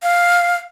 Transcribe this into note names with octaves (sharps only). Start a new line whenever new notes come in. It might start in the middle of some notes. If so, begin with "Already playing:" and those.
F5